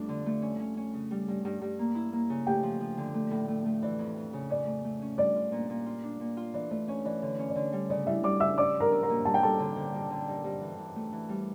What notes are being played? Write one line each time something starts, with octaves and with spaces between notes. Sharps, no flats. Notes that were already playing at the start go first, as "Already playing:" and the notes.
Already playing: F2 G3 A3 D4
D3
A3
C#4
C#4
C#4
C#3
G3
G2
G2
G2
A#3
E4
A#3
C#3
A3 G4 G5
F3
F3
D3
A3
A2
A3
A3
E3 D5
F2
F2
C#3
C#4 D5
A3
A3
C#4
G3 D5
F4
A#2
A#2
F4
D4
A#2
F4
E3 D5
A3 D5
C#4 C#5
E3 D5
D3 C#5
C#4
D5
D3 C#5
G3
C#3 D5
G3 E4 E5
G3 D5 D6
C#3 E5 E6
C#4 D5 D6
F3
A#4 A#5
C#4
A#4 A#5
A#2
G3 A5
G5
G3 A4 A5
D3
D3
G2
D3
G2
G2
E3
E3
A3
E3
G3